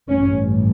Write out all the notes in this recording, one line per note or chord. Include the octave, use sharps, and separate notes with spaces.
A1 G2 C#4